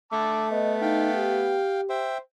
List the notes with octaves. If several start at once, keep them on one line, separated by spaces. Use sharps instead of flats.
A3 A5 D6 E6
B3 D#5
D#4 F5 G5
G4
C5 E5 G5